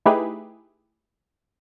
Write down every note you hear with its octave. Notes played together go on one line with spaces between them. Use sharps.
A3 D#4 E4 G4 G#4 B4